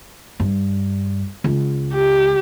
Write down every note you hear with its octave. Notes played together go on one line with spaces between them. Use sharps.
G2
C#2
G4